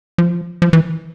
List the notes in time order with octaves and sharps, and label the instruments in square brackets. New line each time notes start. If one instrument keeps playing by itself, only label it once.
[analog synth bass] F3
F3
E3